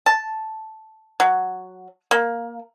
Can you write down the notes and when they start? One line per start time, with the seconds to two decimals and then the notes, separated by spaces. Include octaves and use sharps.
0.06 A5
1.20 F#3
2.11 A#3